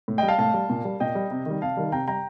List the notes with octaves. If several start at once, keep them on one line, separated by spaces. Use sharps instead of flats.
A2
G3 D#5 G5
F5 A5
A2 F5 A5
G3
A#2
G3
A#2 D#5 G5
G3
C3
D#3 G3
C3 F5 A5
D#3 G3
C3 G5 A#5
G3 G5 A#5